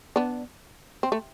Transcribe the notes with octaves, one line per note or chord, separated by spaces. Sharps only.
B3 D4
C4
A3